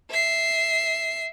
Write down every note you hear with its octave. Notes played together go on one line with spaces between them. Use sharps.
E5 C7